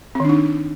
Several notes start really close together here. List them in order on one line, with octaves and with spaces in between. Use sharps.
C4 D#3 D4 D#4